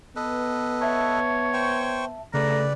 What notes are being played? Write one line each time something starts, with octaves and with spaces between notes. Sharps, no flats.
B3 A4 B4 D#5
C#5 E5 A5
C5 G5 C#6
C#3 G3 A3 B4 D5 A#5